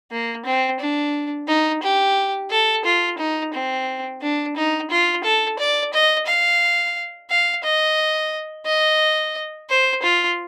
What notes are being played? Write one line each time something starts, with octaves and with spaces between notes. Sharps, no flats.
A#3
C4
D4
D#4
G4
A4
F4
D#4
C4
D4
D#4
F4
A4
D5
D#5
F5
F5
D#5
D#5
C5
F4